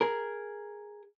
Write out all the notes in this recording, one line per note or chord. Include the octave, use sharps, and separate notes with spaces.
G#4 A#4